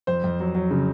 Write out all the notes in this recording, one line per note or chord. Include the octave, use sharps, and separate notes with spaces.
F2 C5
F2
F#3
F#3
C#3